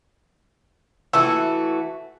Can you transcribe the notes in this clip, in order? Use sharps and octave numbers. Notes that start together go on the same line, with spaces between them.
E3 A3 F#4 E6